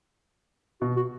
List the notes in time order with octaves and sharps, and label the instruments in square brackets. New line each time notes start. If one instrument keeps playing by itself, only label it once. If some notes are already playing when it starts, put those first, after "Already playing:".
[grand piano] B2 [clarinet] F#4
[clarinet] F#4